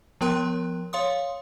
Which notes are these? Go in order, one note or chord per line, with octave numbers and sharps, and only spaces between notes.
F3 B3 A#4 G5 C6 F#6
C#5 F5 C6 D#6